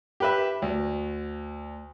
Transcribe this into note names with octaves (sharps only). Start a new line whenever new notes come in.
G4 B4 E5
D2